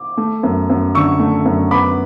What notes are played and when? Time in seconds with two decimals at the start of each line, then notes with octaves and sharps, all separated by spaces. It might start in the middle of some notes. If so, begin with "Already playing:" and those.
Already playing: D6
0.17 A3
0.43 F#2
0.70 F#2
0.95 D3 C#6 E6
1.20 A3
1.45 F#2
1.71 B3 B5 D6